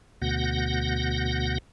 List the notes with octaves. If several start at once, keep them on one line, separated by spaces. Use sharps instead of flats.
D2 B2 F#5 G6 A#6